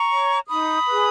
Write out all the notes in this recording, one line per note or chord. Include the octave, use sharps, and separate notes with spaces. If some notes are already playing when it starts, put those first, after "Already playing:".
Already playing: A#5 C#6
C#5
D#4 B5 D#6
G#4 B4